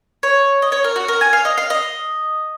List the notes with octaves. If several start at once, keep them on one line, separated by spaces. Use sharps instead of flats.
C#5
D#5
C#5
A#4
F#4
A#4
G#5
F5
D#5
F5
D#5